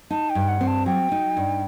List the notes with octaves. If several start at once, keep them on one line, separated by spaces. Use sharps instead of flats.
D#4 A5
G5
G2
F#5
C4
A5
F#3 G5
D#4
G2